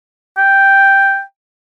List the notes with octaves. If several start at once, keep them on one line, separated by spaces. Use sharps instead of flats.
G5